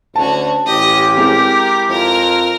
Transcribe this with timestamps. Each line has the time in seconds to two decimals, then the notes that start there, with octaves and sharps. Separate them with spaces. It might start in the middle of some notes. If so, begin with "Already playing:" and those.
0.16 D2 C#4 F#4 A5
0.67 A1 G4 D#5
1.17 G#3 C4 E4 A#4
1.89 F2 A#4